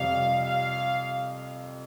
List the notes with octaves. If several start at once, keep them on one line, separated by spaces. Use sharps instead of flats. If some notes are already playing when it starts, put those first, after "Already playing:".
Already playing: F2 C3 G3 F5
F5